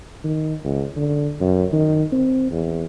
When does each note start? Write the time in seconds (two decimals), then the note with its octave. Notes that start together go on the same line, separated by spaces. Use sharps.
0.24 D#3
0.64 C#2
0.96 D3
1.41 F#2
1.73 D#3
2.12 C4
2.51 E2